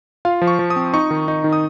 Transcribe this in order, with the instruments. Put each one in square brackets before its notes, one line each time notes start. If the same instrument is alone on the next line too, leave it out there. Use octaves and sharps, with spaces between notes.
[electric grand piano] F4 F5
F3
C#6
F3
D#6
C4
D#4 C#6
D#3
D#4
D#3
D#6